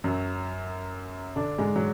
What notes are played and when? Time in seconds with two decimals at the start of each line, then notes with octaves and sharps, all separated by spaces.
0.04 F#2 F#3
1.36 D3 D4
1.58 G#2 G#3
1.76 F#3